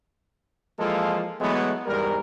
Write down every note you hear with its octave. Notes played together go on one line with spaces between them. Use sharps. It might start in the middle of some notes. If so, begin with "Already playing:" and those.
E3 F3 G#3 A#3 F4 A4
E3 F#3 G#3 A3 B3
E2 G#2 G3 A#4